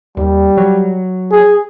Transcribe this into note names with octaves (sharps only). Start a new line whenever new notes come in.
D#2 G3
F#3
G#4